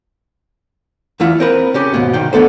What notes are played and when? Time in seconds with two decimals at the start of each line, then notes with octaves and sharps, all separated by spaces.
1.20 E2 E3 E4 F4 F#5
1.40 C4 A#4 B4
1.74 C#3 C#4 G4
1.94 D#2 G#2 B2
2.13 C2 D#3 G5
2.33 D#2 D3 B3 A4 C5